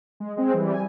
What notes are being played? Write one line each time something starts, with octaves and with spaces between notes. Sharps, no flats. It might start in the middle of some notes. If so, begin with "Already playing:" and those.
G#3
G#3 C4
E3 G3
G#5